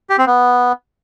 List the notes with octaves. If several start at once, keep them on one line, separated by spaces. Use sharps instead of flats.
G4
C4
B3